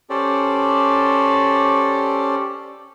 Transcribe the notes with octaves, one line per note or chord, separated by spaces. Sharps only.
C#4 G4 A4 C5 D5